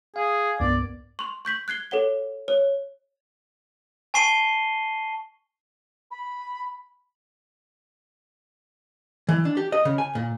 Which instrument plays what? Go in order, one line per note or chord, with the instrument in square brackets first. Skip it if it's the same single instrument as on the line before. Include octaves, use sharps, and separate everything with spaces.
[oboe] G#4 [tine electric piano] F5
[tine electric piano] C2 G2 B3 [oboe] D5
[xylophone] C6 C#6
C#6 G6 B6 F#7
F#6 G#6 C7 G7
A4 C#5 F#5 G7
C#5
[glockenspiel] G#5 A5 C#6 C7 D#7 G7
[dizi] B5
[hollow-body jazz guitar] E3
D4
G4
D#5
C#3
G#5
A#2